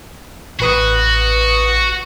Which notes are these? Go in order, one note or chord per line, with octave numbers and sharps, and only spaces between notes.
A1 F#4 B4 D#6